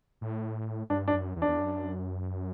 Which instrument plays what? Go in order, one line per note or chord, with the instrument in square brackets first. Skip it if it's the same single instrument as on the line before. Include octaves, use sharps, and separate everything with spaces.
[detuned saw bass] A2
[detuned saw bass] G2 [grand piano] D4
[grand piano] D4
[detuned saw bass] F#2
E2
[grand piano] D4
[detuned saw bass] E2
F#2